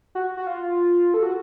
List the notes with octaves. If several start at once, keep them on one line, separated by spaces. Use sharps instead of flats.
F#4
F#4
F4
A4
F#4